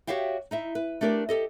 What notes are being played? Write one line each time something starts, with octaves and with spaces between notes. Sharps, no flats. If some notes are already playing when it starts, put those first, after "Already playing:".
F#4 G4 C#5 E5 F5 G5
D#4 E4 E5
B4
A3 D4 G4 A#4 D5
G4 A4 D#5